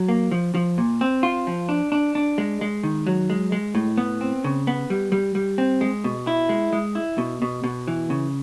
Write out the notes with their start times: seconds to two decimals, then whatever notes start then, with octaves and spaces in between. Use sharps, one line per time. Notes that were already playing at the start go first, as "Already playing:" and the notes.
Already playing: F#3
0.08 A#3
0.32 F3
0.55 F3
0.78 A#2
1.01 C4
1.23 F4
1.47 F3
1.69 D4
1.92 D4
2.15 D4
2.38 G#3
2.61 G#3
2.83 D#3
3.07 F#3
3.30 G#3
3.52 G#3
3.75 A2
3.97 B3
4.21 C4
4.44 C#3
4.67 B3
4.90 G3
5.12 G3
5.35 G3
5.58 C4
5.81 G#3
6.04 B2
6.27 E4
6.49 G#3
6.73 G#3
6.95 E4
7.18 B2
7.42 B2
7.64 B2
7.88 E3
8.10 C#3